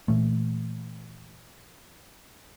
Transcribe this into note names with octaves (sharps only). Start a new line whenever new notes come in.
A#2 E3 A3